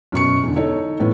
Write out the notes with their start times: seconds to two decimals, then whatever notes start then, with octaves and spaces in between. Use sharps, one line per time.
0.12 F#2 B2 C#6 C#7
0.43 E2 D3
0.56 D#4 A4 C#5
1.00 A2 E3 B3